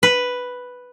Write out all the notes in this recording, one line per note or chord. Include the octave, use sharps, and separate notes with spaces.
B4